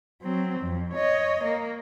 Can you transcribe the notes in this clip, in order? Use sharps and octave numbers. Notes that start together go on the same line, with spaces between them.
F#3 C4
F2
C#5 D#5
A#3